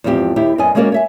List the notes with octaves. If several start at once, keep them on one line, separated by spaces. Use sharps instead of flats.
E2 G#2 F3 C4 G4
D#2 E4 G4
F#2 B3 D5 D#5 G#5
G#3 A#3 C#4 F#4 A#4 D5
C#5 E5 G#5